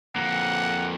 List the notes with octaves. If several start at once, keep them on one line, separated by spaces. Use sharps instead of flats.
F2 A#3 F#5